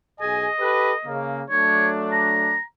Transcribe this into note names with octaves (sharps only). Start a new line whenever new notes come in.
B1 G#4 D#5 G#5
G4 A4 B4
C#3 A#3
F#3 A3 D4 C#5
A#5